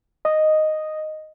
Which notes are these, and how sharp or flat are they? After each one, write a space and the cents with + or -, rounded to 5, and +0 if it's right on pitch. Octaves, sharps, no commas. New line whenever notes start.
D#5 -5